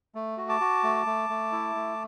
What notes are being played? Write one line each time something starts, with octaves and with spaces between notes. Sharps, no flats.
A3
F#4
A5 D6
F#4
A3
A3
A3
E4
A3